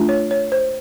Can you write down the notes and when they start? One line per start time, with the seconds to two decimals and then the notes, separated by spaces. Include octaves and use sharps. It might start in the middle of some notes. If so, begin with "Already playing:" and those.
Already playing: A3 D4 F4
0.09 C#5
0.31 C#5
0.52 C5